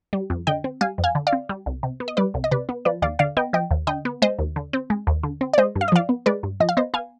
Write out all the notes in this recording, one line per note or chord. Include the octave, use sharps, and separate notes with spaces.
G3
F2
D3 D#5 G5
C4
G3 F5 G#5
F2
F5 G#5
D3
D5 F5
C4
G3
C2
C3
B3
D#5
G3 B4 D5
C2
D#5
C3 B4 D5
B3
F3 B4 D5
D#2 D5 F5
D3 D5 F5
B3 D#5 G5
F3 D#5 G5
D#2
D3 D#5 G5
B3
G#3 C5 D#5
D#2
D3
C4
G#3
D#2
D3
C4
D5
G#3 C5 D#5
G2
F5
D#5
F3 D5 F5
B3
G#3 B4 D5
G2
F3 D#5
F5
B3 C5 D#5
B3 F5 G#5